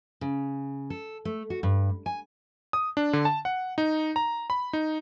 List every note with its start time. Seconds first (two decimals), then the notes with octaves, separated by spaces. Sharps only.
0.21 C#3
0.90 A4
1.25 A3
1.50 F#4
1.63 G2
2.06 G#5
2.73 D#6
2.97 D4
3.13 D3
3.25 A5
3.45 F#5
3.78 D#4
4.16 A#5
4.50 B5
4.73 D#4